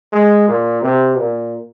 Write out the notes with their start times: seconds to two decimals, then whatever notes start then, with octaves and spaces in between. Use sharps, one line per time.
0.13 G#3
0.48 A#2
0.82 C3
1.18 A#2